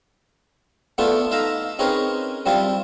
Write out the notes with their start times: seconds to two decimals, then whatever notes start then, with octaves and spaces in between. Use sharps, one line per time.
0.98 A3 B3 D4 E4 F4 A4
1.31 D#4 E5 F5 A5 A#5
1.79 C4 C#4 D#4 G#4 A#4 B4
2.46 G3 C4 D4 E4 F4